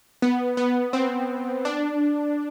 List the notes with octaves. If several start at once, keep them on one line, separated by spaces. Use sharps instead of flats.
B3
B3
C4
D4